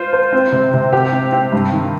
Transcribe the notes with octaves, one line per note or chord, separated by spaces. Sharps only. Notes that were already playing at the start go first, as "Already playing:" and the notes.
Already playing: F4 C5
C5
C4
C3
C3
G4
C4
C4
G2
D#3